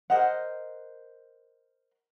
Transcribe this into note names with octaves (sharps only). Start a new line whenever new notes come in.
A#4 C5 D#5 F#5